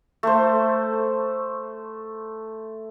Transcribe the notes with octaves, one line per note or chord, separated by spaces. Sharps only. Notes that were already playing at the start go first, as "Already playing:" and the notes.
A3 C5